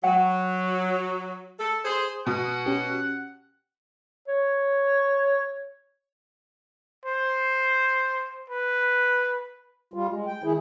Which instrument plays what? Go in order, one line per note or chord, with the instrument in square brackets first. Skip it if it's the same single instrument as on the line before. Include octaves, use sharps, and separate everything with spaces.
[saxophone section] F#3 [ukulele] F#5 G5
[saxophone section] A4
G#4 C5
[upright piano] B2 [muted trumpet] F#5
[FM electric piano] C#4 G4
[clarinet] C#5
[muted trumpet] C5
B4
[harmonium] G3 F4
G#3
G5
D#3 E4 G#4